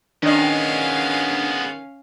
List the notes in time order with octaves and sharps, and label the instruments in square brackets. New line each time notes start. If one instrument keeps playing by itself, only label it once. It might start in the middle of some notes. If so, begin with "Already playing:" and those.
[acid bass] D#3 [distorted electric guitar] G#3 B3 [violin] C#4 F5 [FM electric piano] D4 D#5